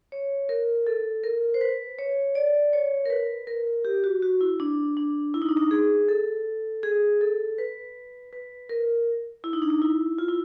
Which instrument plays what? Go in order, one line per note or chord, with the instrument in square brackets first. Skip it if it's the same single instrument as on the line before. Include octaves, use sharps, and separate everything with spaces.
[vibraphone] C#5
A#4
A4
A#4
C5
B4
C#5
D5
C#5
A#4
B4
A#4
G4
F#4
F#4
E4
D4
D4
E4
D#4
D4
D#4
G#4
A4
G#4
A4
B4
B4
A#4
E4
D#4
D4
D#4
E4
F4
E4